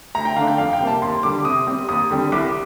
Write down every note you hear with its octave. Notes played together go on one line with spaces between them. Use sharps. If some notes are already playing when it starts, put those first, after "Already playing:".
D2 A#5
G5
D3 A3 D4 F5
G5
F2 F5
G5
C3 G3 A#3
A5
D#2 C6
D3 G3 D6
C3 D#6
G3 C4
D#2 D#6
D3 G3 C4
C2 D6